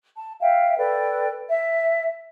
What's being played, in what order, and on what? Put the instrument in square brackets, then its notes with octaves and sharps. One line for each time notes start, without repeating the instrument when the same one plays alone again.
[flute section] A5
E5 F5 G5
A4 B4 D5 G5
E5